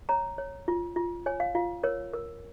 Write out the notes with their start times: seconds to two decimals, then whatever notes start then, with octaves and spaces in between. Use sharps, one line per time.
0.09 C#5 A#5
0.38 C#5
0.68 F4
0.96 F4
1.26 C#5 G#5
1.40 F5
1.55 F4 F5
1.83 A#4 C#5
2.13 A#4